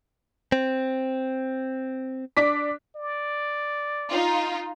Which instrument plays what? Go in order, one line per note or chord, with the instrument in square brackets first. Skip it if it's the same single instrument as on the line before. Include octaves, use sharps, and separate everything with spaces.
[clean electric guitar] C4
[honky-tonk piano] D4 D6 B6
[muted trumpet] D5
[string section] D#4 F4